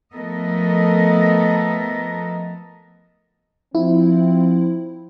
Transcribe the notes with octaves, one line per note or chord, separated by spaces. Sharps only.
F3 A3 B3 A4 A#4 D#5
F3 C4 E4